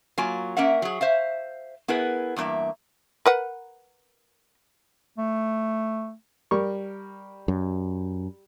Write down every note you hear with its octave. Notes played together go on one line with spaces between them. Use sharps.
F#3 A#3 F4 G#5
A#3 C#4 A#4 E5 F#5
F#3 G#4
C5 E5 F5
B3 E4 G#4 A#4 B4
E2 G2 A#2 A#3 E5
A#4 B4 F#5
A3
G3 A#4 C#6
F#2